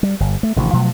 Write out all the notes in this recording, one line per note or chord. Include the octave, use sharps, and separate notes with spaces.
G3
G1
A3
A1 C3 D#3 F3
B2 F3 F#3 A3